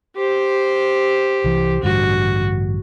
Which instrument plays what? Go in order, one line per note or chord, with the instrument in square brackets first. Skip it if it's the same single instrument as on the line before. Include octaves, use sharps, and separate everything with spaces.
[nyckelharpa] G4 C5
[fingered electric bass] C2 E3
[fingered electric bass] A1 G2 D3 [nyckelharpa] F#4